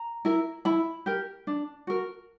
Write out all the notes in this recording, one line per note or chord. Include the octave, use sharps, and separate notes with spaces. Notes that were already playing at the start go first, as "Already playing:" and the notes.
Already playing: A#5
E4 A#4
E4 B5
G4 A#4
D4
F#4 A#4